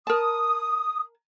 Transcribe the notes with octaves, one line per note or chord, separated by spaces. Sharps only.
A#4 A5 D#6